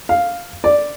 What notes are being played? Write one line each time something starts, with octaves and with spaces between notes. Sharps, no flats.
F5
D5